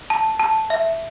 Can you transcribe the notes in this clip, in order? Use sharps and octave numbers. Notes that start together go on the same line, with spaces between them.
A5
A5
E5